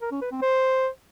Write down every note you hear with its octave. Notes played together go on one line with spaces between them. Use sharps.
A#4
C#4
B4
C4
C5